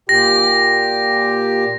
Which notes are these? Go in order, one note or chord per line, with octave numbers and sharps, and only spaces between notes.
A#2 G4 A#6